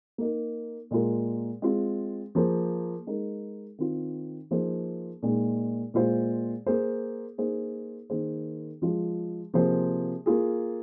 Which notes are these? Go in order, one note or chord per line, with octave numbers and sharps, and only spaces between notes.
A#3 D#4 A#4
A#2 G#3 F4 A#4
G#3 C4 F4
F3 A#3 G#4 C5
G#3 D#4 A#4
D#3 C4 F4
F3 A#3 D#4 G#4 C5
A#2 G#3 D#4
A#2 G#3 F4 C5
A#3 G#4 C5
A#3 D#4 G#4 C5
D#3 A#3 G#4 C5
F3 G#3 F4
C3 F3 A#3 G#4 C5
A#3 F4 G#4